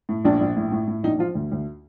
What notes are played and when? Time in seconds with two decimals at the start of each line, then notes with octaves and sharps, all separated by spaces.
0.09 A2
0.25 A#1 D4
0.41 A#1
0.57 A2
0.72 A2
0.88 A2
1.03 A#1 D#4
1.19 F3 F4
1.35 D2
1.51 D2